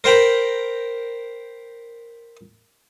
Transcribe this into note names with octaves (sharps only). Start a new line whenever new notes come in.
A#4 C5 G5 A#5 B5